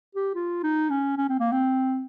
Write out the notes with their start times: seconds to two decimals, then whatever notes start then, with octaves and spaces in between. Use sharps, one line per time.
0.15 G4
0.35 F4
0.63 D#4
0.90 C#4
1.17 C#4
1.29 C4
1.39 A#3
1.52 C4